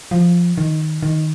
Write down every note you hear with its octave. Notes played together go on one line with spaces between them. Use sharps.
F3
D#3
D#3